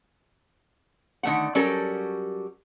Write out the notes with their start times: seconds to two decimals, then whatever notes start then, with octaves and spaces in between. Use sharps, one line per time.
1.23 D3 D#3 G#3 A3 F#5
1.55 F#3 G3 C#4 G4 A4 A#4